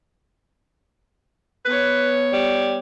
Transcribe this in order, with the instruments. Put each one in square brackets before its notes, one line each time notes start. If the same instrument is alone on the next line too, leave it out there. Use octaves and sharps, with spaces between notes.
[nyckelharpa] B3 C#5 [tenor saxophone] B4
[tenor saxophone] G3